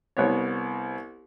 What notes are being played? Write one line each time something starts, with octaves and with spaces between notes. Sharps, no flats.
C2 B3 C#5